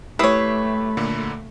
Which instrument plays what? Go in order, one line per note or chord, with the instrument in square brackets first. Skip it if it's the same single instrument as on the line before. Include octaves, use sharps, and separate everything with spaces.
[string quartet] A3 [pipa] E4 C#5 [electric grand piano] G4 E5 C7 [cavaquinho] B4 D#6
[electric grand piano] A#2 D3 A#3